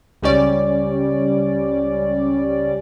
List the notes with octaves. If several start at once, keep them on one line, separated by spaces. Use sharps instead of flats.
C#2 G3 C#4 D5